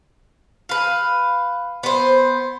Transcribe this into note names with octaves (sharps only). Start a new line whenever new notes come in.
B4 F5
B3 C5